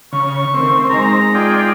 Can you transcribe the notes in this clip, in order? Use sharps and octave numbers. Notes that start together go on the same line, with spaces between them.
C#3 C#6
D#3 A3 C4
G#3 D#4 A#5
F4 G#4 D5 G5